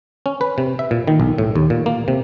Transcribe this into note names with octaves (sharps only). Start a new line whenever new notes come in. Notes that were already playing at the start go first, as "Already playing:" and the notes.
C#4
B4
C3
E5
A#2
D#3
B1
A2
D#2
A#2
A#3
C3